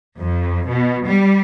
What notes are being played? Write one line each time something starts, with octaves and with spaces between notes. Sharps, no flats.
F2
B2
G3